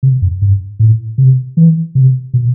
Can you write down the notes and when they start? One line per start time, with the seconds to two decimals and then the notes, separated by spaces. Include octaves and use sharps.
0.03 C3
0.22 F#2
0.42 G2
0.79 A2
1.18 C3
1.57 E3
1.95 C3
2.34 B2